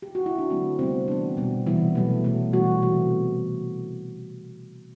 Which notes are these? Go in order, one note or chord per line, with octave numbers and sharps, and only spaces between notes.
G4
F#4
E4
D4
D3 F#3 A3 C4
C3 G3 B3 C4
E3 B3 D4
B2 G3 B3
C3 E3 G3 B3 E4
B2 F#3 A3
B2 A3
E3 G3 B3 F#4
C3 E3 A3